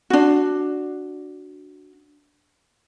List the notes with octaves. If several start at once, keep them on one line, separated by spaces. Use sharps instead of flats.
D4 F#4